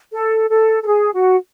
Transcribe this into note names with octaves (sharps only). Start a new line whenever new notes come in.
A4
A4
A4
G#4
F#4